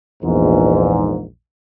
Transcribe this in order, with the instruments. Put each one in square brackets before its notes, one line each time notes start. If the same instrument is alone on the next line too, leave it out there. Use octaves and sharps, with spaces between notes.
[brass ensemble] A#1 E2 G#2